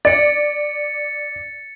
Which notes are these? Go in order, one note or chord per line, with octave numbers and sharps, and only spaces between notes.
D5 A6 C#7